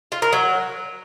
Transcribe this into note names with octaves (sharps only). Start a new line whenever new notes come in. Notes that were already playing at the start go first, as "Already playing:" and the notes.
F4
A#4
F#3